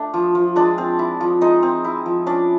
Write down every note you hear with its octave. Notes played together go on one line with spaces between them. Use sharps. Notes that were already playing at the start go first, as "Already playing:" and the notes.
Already playing: A3 D4
F3
F3
G#3 D4 D5
C4
E4
F3
G#3 D#4 D#5
C4
E4
F3
C#4 D4 D5